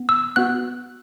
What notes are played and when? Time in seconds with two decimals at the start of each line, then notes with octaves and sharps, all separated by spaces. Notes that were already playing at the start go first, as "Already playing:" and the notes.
Already playing: B3
0.09 E6
0.36 B3 F#4 F#6